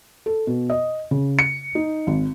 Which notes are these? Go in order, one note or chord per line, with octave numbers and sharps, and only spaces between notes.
A4
B2
D#5
C#3
C#7
D#4
G#1